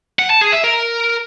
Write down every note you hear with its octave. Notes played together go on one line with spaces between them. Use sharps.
F#5
A5
G#4
E5
A#4